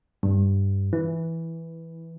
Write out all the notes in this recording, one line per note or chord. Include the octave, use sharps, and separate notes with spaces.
G2
E3